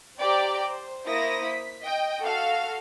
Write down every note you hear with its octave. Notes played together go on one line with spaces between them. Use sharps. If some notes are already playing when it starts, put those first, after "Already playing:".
G4 C5 D5 G5 A#5 D6
C5
A#3 E4 C5 D#6 A#6
B6
D#5 G5
F#4 A4 F5 F6